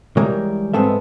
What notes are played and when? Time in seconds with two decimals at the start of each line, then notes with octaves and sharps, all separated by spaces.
0.17 E3 G3 G#3 A#4 C#5
0.74 G#2 G#3 B3 C4 A4 E5